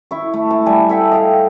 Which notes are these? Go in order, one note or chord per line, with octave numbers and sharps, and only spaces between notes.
E4 C#6
A3
A5
G3 G#5
A4 E5 G5
D#5 F5 G5